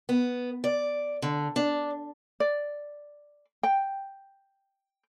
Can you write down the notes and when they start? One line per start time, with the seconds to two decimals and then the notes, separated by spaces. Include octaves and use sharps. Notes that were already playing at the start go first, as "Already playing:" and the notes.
0.09 B3
0.64 D5
1.22 D3
1.56 D4
2.40 D5
3.63 G5